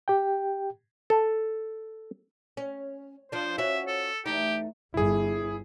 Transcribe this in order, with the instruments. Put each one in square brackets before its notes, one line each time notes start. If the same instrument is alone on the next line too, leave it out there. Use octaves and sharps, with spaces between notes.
[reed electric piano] G4 G5
[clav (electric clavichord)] A4
[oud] C#4
[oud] F3 D4 [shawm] C5
[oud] C#4 F#4 [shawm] E5
[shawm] A4
[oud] E2 A3 D#4 [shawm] G4
[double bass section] G1 [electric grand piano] E4 G#4